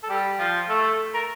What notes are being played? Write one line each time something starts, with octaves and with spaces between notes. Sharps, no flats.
A4
G3 G4
F3 F4
A3 A4
A#4